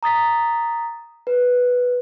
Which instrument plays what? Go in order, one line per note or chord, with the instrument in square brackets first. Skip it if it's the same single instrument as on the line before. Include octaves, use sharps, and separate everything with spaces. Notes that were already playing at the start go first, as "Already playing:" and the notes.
[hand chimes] A#5 D#6 A6 B6
B4